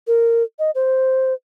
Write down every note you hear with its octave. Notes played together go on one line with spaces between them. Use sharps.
A#4
D#5
C5